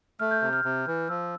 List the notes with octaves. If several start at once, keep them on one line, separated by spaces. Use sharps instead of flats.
A3 F6
G6
C3 G6
F6
C3
E3
F3 E6